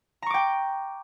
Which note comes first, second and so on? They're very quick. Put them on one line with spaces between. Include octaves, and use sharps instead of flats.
A#5 C#6 D6 G5